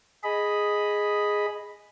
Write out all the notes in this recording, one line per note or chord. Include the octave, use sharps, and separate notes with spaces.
G#4 D#5 B5